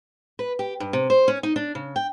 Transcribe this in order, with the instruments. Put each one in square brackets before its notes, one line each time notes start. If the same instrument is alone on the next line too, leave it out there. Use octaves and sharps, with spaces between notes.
[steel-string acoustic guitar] B4
G4
G2
C3
C5
C#4
D#4
D4
C#3
G5